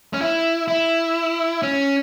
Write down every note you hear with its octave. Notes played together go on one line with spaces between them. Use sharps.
C#4
E4
E4
C#4